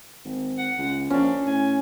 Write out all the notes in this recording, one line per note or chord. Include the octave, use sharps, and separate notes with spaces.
G#1
F#5
C#2
A#1 C#4 D4
A2 G#5